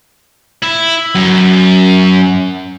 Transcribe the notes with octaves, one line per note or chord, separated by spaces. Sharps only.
E4
F#2